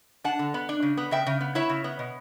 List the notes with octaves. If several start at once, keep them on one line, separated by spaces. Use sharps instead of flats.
D4 F#5 A5
D3
B3
D4
C#3
B3
C#3 E5 G5
C#3
B3
E4 C#5 E5
C#3
B3
B2